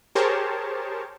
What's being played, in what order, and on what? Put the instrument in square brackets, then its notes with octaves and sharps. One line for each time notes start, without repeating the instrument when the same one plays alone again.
[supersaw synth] G4 G#4 A#4 C5 C#5 A5